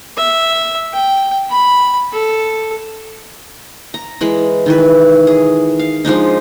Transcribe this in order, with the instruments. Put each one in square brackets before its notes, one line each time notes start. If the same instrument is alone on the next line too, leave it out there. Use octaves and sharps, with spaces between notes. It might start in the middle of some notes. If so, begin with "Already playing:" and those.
[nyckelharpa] E5
G5
B5
A4
[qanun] A#5
E3 G#3 B5
D#3 E3 B4
G#4
F5
F3 G#3 D4 D#4